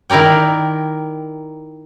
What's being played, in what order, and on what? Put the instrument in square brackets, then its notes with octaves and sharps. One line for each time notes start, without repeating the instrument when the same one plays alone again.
[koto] D#3 E4 A#4 D5 G5